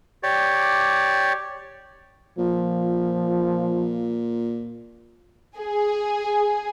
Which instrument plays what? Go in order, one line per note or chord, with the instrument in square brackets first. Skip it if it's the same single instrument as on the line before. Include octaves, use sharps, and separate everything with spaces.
[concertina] G4 C#5 D5
[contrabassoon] A#2 [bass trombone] F3
[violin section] G#4